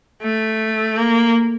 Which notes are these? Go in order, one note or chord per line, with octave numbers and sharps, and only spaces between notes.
A3
A#3